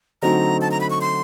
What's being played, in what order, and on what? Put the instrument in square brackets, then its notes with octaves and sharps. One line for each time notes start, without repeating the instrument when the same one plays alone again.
[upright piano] D3 F#3 A3 C4 D#4 [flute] A#5
[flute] A5
A#5
B5
C#6
C6